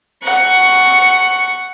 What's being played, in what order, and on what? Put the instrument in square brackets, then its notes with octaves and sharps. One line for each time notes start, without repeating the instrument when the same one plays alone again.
[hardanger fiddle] F#5 C#6